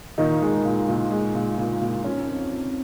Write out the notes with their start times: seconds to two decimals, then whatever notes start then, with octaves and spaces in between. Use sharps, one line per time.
0.18 A#2 D#3 D#4
0.42 G#3
0.65 A#2
0.88 A#2
1.12 G#3
1.34 A#2
1.58 A#2
1.81 A#2
2.04 F3 C#4
2.27 F2
2.51 F2